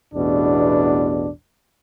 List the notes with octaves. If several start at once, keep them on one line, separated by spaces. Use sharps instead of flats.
A1 E2 B2 D4